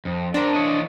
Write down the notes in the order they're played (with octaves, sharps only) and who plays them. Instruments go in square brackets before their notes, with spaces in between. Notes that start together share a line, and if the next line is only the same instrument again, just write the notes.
[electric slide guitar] F2
[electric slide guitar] C4 A#4 [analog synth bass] D4
[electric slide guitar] E3 C#5 D#5